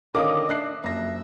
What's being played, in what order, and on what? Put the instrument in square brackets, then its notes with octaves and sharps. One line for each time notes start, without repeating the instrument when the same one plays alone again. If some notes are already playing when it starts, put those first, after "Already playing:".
[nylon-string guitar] D3 D#3 C#4 [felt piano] A#4 F5 [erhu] D#5 [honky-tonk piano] D6 D#6
[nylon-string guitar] D4 [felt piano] E5 F#6 C7
[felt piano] F#1 A#6 [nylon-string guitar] F2 [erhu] E5